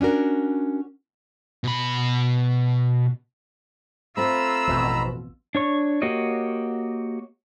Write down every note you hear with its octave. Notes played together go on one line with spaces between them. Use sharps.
C#4 D4 F#4 A#4
B2 B5
A3 C4 F4 A#5 B5 E6
A1 F2 B2
D4 C#5 C#6
A#3 F#4 G4 C#5 D#5